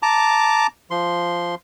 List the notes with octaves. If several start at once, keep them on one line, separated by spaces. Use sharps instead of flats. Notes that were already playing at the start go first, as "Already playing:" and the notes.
A5 A#5 D6
F3 C6